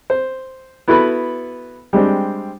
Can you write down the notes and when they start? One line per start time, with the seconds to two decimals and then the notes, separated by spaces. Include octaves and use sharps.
0.10 C5
0.88 B3 E4 F#4 A4 B4 B5
1.93 G3 G#3 C4 D4